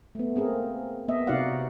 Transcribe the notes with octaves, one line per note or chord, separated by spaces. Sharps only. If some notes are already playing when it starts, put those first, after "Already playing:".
A3 B3
A#3 C4 G#4 A#4
A#3 B3 D#5 E5
C3 D#4 F#4 D5 F5 F#5